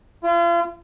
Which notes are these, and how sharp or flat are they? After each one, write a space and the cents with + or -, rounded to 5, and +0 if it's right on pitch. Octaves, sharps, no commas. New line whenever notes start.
F4 -40